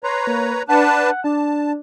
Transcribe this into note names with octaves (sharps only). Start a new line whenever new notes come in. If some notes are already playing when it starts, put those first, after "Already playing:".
B4 C#5 A#5 C6
A#3
D4 B4 F#5 A5
D4 A5